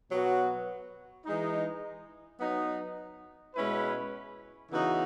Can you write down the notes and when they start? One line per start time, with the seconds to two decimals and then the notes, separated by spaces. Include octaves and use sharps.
0.10 B2 F#3 B3 F#4
1.25 E3 G#3 D#4
2.40 F#3 B3 D#4
3.55 B2 G#3 C#4 E4 B4
4.70 C#3 E3 B3 D#4 F#4